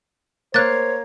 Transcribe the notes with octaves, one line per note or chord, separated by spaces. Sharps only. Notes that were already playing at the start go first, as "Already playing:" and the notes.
A#3 C5 C#5 F5 F#6 A6